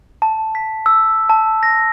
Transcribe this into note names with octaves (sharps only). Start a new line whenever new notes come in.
A5
B6
E6
A5
A#6